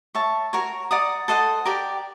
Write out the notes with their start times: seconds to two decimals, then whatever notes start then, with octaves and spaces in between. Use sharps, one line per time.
0.15 C#5 E5 A5
0.53 F#4 A#4 C#5
0.91 D5 F#5 A#5 D#6
1.28 A4 C5 D#5 F#5
1.65 G4 A#4 D5 G5